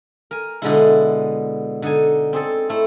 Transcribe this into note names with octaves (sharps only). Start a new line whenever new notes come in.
A#4 G#5
B2 D3 G#3 E4
D3 D#4 G#5
C4 G#4 A4
A3 C4 E4